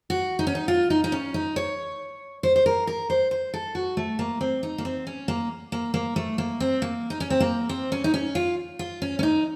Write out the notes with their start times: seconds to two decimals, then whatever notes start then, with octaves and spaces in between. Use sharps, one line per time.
0.10 F#4
0.39 D#4
0.47 C#4
0.55 D#4
0.68 F4
0.90 D#4
1.04 D#4
1.12 C#4
1.34 D#4
1.56 C#5
2.43 C5
2.56 C5
2.66 A#4
2.87 A#4
3.10 C5
3.31 C5
3.54 A4
3.75 F#4
3.97 A3
4.19 A#3
4.41 C4
4.63 D#4
4.78 A#3
4.85 C4
5.07 C#4
5.28 A#3
5.72 A#3
5.94 A#3
6.16 A3
6.38 A#3
6.60 C4
6.82 A#3
7.10 D#4
7.20 C#4
7.30 C4
7.40 A#3
7.69 C4
7.92 C#4
8.04 D#4
8.14 C#4
8.35 F4
8.79 F4
9.02 C#4
9.19 C#4
9.23 D#4